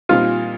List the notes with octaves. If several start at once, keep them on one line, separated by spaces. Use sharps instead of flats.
A#2 G3 C4 D#4 F4